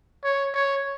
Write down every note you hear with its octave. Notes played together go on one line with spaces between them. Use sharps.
C#5
C#5